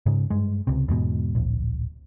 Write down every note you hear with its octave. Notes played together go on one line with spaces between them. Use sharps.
G#2 C#3
G2 G#3
C#2 C3
E2 G#2 B2
D1 A#1